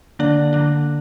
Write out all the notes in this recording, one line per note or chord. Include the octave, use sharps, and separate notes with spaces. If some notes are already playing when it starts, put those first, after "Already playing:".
D3 A#3 D4 D5
D3 A#3 D4